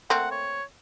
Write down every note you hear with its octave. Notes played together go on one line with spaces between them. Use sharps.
A3 A#3 C4 F#5
C#5